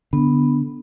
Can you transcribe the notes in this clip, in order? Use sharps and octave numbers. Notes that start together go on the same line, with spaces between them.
D3 B3